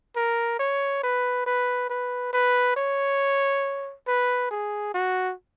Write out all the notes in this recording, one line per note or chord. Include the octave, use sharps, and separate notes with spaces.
A#4
C#5
B4
B4
B4
B4
C#5
B4
G#4
F#4